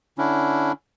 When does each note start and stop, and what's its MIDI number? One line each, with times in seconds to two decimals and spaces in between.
0.18 0.72 50
0.18 0.72 61
0.18 0.72 62
0.18 0.72 64